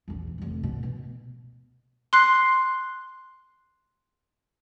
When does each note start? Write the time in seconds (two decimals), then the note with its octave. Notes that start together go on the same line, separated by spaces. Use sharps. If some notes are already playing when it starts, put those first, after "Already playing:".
0.08 A#1 E2
0.38 F1 D2
0.63 B2
0.83 B2
2.13 C6 F#6 C7